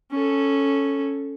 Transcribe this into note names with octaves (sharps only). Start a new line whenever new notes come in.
C#4 A4